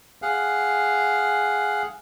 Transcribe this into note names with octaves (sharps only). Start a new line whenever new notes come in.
G#4 F5 F#5